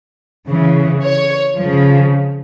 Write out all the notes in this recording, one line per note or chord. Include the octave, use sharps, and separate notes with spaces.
C#3 E3
C#5
C#3 F3